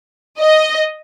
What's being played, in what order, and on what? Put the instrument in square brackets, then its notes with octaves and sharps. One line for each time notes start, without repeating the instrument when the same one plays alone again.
[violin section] D#5